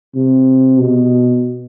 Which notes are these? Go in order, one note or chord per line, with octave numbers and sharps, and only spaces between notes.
C3
B2